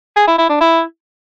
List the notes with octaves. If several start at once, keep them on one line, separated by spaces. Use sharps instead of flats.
G#4
E4
E4
D4
E4